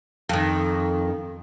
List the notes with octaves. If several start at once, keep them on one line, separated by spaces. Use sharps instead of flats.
F2 D#3